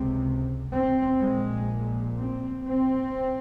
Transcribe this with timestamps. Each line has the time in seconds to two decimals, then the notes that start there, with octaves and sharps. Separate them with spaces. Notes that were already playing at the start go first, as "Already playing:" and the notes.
Already playing: C#2 C3 C4
0.76 C4
1.24 A#1 A#2 G#3
2.19 C4
2.67 C4